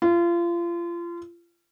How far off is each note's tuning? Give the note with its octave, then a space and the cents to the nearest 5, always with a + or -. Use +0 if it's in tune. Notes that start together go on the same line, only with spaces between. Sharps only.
F4 -30